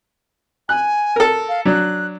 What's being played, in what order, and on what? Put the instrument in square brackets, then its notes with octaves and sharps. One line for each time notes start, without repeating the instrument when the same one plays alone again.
[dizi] G#5 [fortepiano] F#6
[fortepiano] A4 A#4
[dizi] F5
[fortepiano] F#3 D4 [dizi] F#6